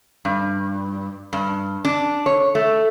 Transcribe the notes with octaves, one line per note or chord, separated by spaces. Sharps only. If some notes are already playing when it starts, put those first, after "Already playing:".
G2
G2
D4
C#5
A3